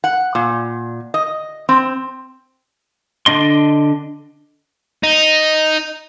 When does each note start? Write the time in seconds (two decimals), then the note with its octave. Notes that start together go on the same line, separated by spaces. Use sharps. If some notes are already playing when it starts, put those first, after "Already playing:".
0.04 F#5
0.35 A#2
1.14 D#5
1.69 C4
3.26 D3 D4 D#5 C6
5.04 D#4